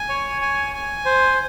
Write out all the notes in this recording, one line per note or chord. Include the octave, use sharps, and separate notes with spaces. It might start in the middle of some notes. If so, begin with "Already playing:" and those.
Already playing: G#5
C#5
G#5
G#5
C5